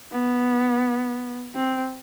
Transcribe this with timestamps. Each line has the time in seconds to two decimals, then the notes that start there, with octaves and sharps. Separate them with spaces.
0.12 B3
1.56 C4